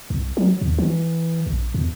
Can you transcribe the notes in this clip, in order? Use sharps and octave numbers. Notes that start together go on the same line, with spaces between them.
C2
F#3
D#2
E3
A#1
E2